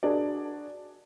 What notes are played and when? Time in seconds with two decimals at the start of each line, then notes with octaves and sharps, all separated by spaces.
0.03 D4 F#4 G#4 A#4 D5